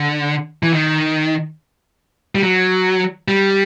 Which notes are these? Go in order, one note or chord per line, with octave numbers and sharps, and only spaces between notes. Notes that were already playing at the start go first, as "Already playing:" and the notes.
Already playing: D3
E3
D#3
G3
F#3
G3